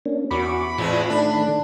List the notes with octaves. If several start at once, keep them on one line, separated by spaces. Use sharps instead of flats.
A#3 C#4 D4
E2 F#4 B5 C#6 D6
E2 A2 G#3 C4 F4
D#3 A3 D4